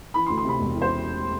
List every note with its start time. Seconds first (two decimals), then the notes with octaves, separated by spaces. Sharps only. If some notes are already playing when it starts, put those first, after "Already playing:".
0.14 E3 B5
0.26 C6
0.29 D2
0.38 C6
0.44 C3 B5
0.59 E1
0.75 E3
0.82 C5